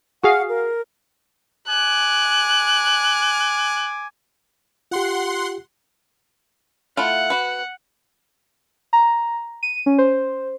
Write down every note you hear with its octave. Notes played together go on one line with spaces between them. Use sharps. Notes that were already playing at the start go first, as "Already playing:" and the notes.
F#4 G#4 F5 F#5
A#4
G#5 D6 F#6
F4 G4 F#5 C6
A3 E4 F4 F#5
F#4 B4
A#5
D#7
C#4
C5